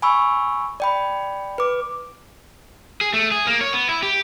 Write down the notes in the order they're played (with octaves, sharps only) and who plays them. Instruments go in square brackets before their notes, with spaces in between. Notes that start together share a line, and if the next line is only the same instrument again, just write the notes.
[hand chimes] G#5 B5 C#6 E6
D5 G5 B5
B4 D6
[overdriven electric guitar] G#4
A3
G#4
A#3
C#5
B3
E4
G4